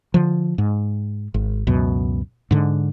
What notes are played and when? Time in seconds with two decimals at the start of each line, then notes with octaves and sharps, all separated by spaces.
0.14 D3 F3
0.58 G#2
1.34 G#1
1.67 C#2 F#2 B2
2.51 G#2 D3